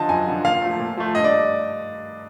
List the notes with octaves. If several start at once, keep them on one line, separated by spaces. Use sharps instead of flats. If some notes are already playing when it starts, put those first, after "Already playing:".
Already playing: D3 F3 D#5 A5
F#2 G#5
D3 F3
A#2 F5
F3 A3
A#2
F3 A3
G2 D#5
D5